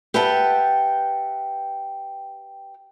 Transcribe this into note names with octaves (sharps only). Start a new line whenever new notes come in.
G4 B4 E5 F#5 G5 A5